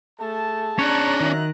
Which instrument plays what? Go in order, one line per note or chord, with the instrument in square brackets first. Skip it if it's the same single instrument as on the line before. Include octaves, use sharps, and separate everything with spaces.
[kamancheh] A3 [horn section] G#4 A5
[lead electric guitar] C#4 D4 [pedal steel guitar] C#5 [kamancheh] A#5 F#6
[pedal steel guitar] D#3 [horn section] F#3 D#4 E5